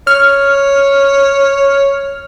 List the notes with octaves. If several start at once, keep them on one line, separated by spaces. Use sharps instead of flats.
C#5 F6